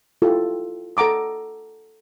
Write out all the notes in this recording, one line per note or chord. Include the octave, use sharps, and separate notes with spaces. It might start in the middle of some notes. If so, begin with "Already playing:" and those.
E4 F4 G4 A4
A4 F#5 A#5 D6 D#6